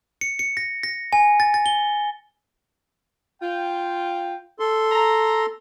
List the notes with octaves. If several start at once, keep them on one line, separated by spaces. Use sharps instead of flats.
C#7
C#7
A#6
A#6
G#5
A6
A6
G7
F4 G5
A4 C6
A#5